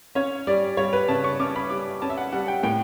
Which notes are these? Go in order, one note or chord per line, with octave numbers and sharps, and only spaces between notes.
C#4 C#5
G3 D5
G3 C#5
B4
C#3 A5
C#6
C#4 D6
B5
G3 D6
C#4 A5
E5
F#5
G3 F#5
G5
A2 G5